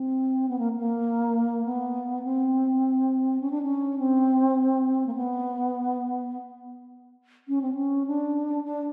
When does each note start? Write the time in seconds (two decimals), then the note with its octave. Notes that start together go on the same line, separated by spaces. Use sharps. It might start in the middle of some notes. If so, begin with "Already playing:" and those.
Already playing: C4
0.49 B3
0.59 A#3
0.78 A#3
1.65 B3
2.24 C4
3.40 C#4
3.51 D4
3.63 C#4
3.99 C4
5.07 A#3
5.15 B3
7.48 C#4
7.62 C4
7.75 C#4
8.07 D4
8.65 D4